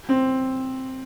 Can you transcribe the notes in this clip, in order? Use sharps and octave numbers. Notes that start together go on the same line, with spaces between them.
C4